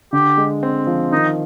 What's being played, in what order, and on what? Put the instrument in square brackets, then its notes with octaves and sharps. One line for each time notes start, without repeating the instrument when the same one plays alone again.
[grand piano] D3 [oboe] G4
[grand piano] G#3
C4
F3
[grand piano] D#3 [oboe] D#4